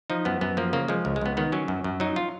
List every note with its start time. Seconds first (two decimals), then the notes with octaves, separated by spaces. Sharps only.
0.10 F3 D#4
0.25 F#2 B3
0.41 F#2 B3
0.57 F3 A#3
0.73 C#3 A#3
0.88 F3 G#3
1.05 C#2
1.16 G#3
1.21 C#2 B3
1.37 D#3 B3
1.52 F#3 C#4
1.68 F#2
1.84 F#2
2.00 F#3 D#4
2.16 F4